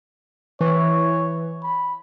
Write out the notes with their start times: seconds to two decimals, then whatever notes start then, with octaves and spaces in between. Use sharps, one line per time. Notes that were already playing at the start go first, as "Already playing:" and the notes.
0.61 E3 C#5
1.63 B5